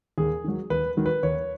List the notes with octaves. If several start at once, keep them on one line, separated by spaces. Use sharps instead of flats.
D#2 G#4
D#3 F#3
D#2 B4
D#3 F#3
B4
D#2 C#5